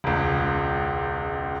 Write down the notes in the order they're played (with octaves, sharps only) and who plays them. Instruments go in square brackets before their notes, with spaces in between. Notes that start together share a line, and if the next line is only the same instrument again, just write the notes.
[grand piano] E1 C#2